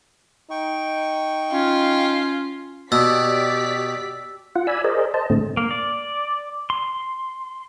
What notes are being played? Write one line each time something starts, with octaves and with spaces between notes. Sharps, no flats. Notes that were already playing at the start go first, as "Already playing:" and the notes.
D#4 G5 C#6
C#4 F4
B2 G4 D5 E6 B6
F4 F#5
D5 G#5 B5 E6
G#4 A#4 C5 D5 D#5
C5 D#5 A5
A2 D3 A3 C4
A#3
D5
C6